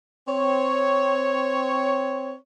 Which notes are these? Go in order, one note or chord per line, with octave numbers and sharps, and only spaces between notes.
C4 C#5